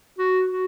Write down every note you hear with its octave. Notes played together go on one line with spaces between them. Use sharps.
F#4
F#4